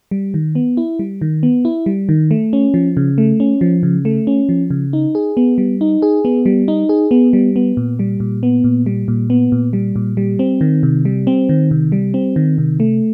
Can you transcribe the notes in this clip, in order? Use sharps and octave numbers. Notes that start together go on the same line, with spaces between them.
G3
D#3
B3
E4
G3
D#3
B3
E4
G3
D#3
A3
C#4
F3
C#3
A3
C#4
F3
C#3
A3
C#4
F3
C#3
D#4
G#4
B3
G3
D#4
G#4
B3
G3
D#4
G#4
B3
G3
B3
A#2
G3
A#2
B3
A#2
G3
A#2
B3
A#2
G3
A#2
G3
C4
D#3
C3
G3
C4
D#3
C3
G3
C4
D#3
C3
A3